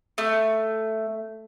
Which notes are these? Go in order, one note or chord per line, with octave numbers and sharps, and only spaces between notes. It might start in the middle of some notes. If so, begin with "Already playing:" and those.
A3